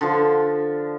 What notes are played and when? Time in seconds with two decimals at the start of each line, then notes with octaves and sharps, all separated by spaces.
0.01 D3 F3